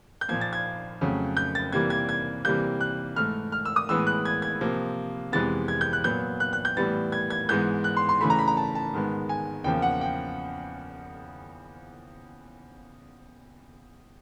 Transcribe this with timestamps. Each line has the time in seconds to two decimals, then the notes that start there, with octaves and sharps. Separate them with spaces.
0.21 G6
0.29 A#2 F3 A#3 G#6
0.41 A6
0.53 G#6
1.01 F2 C#3 F#3 A3
1.37 G6
1.55 A6
1.72 C3 E3 G3 A#3 G#6
1.90 G#6
2.09 G#6
2.45 C3 E3 G3 A#3 G6
2.81 F#6
3.16 G#2 E3 A3 F6
3.52 F6
3.65 E6
3.76 D#6
3.89 A2 E3 G#3 B3 E6
4.07 F#6
4.25 G#6
4.42 G#6
4.61 C3 F3 A#3
5.32 F2 C3 E3 G#3 B3 A6
5.68 G#6
5.81 G6
5.93 F#6
6.04 A#2 F#3 B3 G6
6.40 F#6
6.53 F#6
6.65 G6
6.77 A2 E3 G3 B3 A6
7.12 G#6
7.30 G#6
7.49 G#2 E3 G#3 B3 G6
7.84 F#6
7.97 C6
8.09 C6
8.21 C#3 E3 A3 B5
8.30 A#5
8.39 B5
8.48 A#5
8.57 A5
8.75 A5
8.93 G#2 D#3 G#3 B3
9.29 G#5
9.64 E2 C#3 F3 A#3 G5
9.82 F#5
10.01 G5